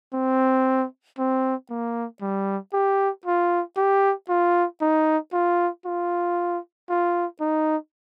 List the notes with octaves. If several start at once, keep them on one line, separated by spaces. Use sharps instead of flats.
C4
C4
A#3
G3
G4
F4
G4
F4
D#4
F4
F4
F4
D#4